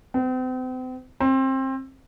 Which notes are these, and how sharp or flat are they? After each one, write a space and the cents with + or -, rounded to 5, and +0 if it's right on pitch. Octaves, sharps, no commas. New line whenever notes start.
C4 -40
C4 +25